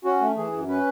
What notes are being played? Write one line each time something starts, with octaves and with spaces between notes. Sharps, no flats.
C#4 F#4
A3
E3 G#4
F#2
C#4 B4